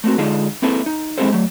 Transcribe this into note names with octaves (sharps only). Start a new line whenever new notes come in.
A3 A#3 C4 F#4
D3 G#3 D#4 F4 G#4 A4
A#3 C4 E4 G#4 A4 B4
D#4
G#3 C4 E4 G4 A4 C5
F#3 A3